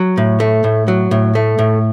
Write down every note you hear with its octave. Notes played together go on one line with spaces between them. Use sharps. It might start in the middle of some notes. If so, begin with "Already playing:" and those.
Already playing: F#3
A2
A3
A2
F#3
A2
A3
A2